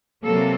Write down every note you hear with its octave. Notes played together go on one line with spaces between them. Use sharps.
C3 F#3 A#3 A4